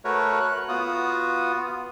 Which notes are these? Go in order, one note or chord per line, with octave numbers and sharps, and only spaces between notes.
A3 F#4 A#4 B4 C#5
F#6
B3 F4 F#4 D#6